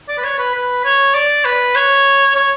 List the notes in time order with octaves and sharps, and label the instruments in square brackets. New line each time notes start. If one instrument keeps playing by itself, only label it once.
[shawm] D5
B4
C#5
B4
B4
C#5
D5
B4
C#5
C#5